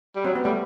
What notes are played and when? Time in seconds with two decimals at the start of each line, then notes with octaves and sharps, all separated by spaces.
0.15 G3
0.25 F#3 C4
0.35 B3
0.45 G3 A3